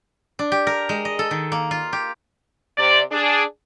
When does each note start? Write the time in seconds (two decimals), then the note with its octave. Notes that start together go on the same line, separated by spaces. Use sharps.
0.39 D4
0.52 G4
0.67 A#4
0.89 G#3
1.05 D#5
1.19 A4
1.31 D#3
1.52 A#3
1.71 F4
1.93 G4
2.77 C3 D5
3.12 D4 G#4